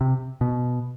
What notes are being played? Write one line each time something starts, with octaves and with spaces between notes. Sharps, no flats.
C3
B2